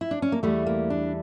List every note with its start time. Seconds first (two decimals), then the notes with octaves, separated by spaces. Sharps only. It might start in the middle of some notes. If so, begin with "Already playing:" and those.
0.01 E4
0.11 D4
0.22 C#4
0.32 A#3
0.43 E2 E3 G3 A3
0.66 A#3
0.90 D4